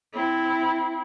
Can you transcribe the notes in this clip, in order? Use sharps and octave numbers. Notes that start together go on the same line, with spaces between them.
C4 E4